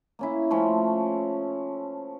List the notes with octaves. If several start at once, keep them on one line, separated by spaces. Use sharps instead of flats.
A#3 C#4 E4
F3 A3 C#4